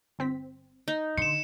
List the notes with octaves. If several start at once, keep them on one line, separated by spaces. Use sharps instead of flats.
G1 C4 B6
D#4
D3 C6 C#7 E7